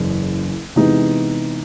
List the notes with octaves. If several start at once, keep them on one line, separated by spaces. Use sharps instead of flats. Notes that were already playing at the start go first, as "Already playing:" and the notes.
Already playing: F#1 E2 C#3
C3 E3 G#3 B3 D#4